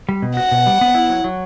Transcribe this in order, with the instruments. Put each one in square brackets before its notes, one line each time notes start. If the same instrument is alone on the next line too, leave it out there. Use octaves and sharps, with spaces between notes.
[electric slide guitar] G3
B2
[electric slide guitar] F#4 [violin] F#5
[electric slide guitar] B2
G3
B3
E4
F#3
F#3